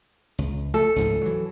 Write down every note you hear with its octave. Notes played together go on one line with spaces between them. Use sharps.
C#2
A3 A4
C#2 G#2 F3
E3 F#3